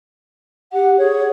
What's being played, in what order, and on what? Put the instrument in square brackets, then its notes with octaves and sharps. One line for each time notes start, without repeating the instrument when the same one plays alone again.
[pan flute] G4 [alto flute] F#5
[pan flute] G#4 [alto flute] C#5